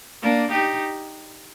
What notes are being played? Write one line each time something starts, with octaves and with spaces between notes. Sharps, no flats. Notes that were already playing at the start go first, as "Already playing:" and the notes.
A#3 D4
D#4 G4